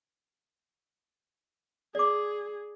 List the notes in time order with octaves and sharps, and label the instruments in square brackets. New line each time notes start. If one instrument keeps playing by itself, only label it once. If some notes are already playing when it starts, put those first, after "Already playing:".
[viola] G#4 [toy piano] D5 D6